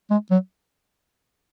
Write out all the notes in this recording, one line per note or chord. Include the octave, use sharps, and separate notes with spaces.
G#3
F#3